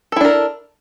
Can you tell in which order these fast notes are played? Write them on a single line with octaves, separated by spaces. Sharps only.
A4 E4 D4 A#4